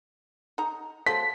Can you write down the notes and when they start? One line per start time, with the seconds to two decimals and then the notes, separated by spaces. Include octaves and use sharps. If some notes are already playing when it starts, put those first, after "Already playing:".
0.58 D#4 A#5
1.06 F3 F#3 A3 B6